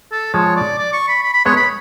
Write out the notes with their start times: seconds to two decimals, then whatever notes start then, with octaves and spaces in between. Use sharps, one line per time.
0.12 A4
0.34 F3 G#3 C#5
0.56 D5
0.78 D5
0.93 C#6
1.08 B5
1.23 B5
1.34 B5
1.45 G#3 B3 C#5
1.57 B5